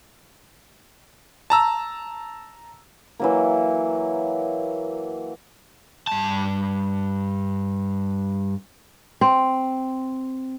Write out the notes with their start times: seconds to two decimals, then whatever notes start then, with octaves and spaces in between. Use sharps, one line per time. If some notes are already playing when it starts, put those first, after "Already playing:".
1.50 A5 A#5 E6
3.20 E3 F#3 A#3
6.07 G2 A5
9.21 C4